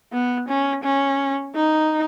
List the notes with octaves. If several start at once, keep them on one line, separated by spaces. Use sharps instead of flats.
B3
C#4
C#4
D#4